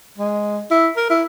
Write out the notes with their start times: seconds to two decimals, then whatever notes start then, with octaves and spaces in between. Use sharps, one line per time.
0.18 G#3
0.71 E4
0.97 A#4
1.10 E4